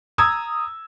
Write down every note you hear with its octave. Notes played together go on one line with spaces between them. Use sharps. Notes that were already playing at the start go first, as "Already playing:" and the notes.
A#5 D#6 E6 G#6